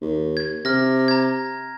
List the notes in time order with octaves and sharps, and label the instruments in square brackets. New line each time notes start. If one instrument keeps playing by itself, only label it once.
[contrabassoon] D#2
[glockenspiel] G#6
[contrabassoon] C3 [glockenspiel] F6 A#6
[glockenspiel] A#5 G#6